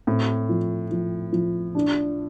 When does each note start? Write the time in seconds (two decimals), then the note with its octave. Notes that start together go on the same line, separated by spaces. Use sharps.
0.07 A2 C4
0.49 F3
0.91 F3
1.33 F3
1.75 D4